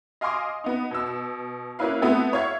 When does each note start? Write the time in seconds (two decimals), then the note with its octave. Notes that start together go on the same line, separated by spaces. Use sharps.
0.21 D#5 F5 G#5 C6 D6 D#6
0.64 B3 D#4
0.91 B2 E6
1.79 A#3 C#4 E4 B4 F5
2.02 A3 B3 C4 E4 A4 B4
2.33 C#5 E5 F5 G#6